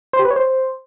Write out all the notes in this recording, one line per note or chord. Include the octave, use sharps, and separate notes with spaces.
C5
G4
B4
C#5
C5